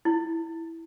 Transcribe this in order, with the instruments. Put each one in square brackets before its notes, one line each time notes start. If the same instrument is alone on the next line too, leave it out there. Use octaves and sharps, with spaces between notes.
[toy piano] E4